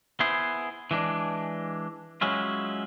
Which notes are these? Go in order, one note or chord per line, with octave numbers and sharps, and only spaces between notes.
B3 E4 G#4 C5
E3 G#3 D4
F#3 G#3 C#4 E4 F4